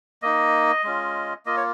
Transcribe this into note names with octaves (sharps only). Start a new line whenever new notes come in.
A#3 D#4 D#5
G#3 C#4 F4
A#3 F4 D#5
C#5